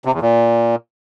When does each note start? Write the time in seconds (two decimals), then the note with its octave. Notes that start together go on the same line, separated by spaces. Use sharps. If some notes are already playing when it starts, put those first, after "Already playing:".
0.05 C3
0.13 E2
0.21 A#2